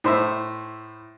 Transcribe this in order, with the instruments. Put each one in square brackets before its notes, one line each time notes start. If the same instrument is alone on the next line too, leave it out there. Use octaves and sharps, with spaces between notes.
[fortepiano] A2 C5 E5